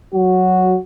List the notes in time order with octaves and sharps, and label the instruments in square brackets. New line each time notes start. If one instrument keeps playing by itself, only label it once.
[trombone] F#3 [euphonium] F#4